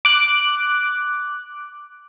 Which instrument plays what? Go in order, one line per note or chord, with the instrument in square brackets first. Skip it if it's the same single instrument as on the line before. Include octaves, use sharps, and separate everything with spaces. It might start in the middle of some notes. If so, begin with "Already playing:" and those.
[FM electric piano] D6 F#6